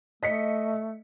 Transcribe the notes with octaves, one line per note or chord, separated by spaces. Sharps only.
A3 D#5 B6 C#7